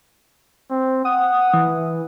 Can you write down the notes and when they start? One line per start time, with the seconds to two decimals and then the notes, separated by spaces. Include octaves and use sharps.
0.70 C4
1.05 F#5 D#6
1.54 E3